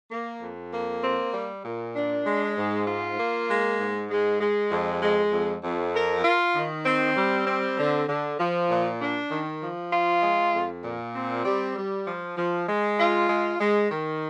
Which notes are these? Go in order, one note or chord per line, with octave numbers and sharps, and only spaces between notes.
A#3
F2
A#3
C4
G3
A#2
D4
G#3
G#2
F4
A#3
G#3
G#2
G#3
G#3
F2
G#3
F2
F2
A#4
F4
D#3
C4
G3
C4
D3
D3
F3
A#2
D4
D#3
F3
F4
G#3
F2
A#2
C4
G3
G3
F3
F3
G#3
F4
G#3
G#3
D#3